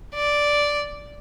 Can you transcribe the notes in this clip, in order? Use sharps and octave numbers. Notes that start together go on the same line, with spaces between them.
D5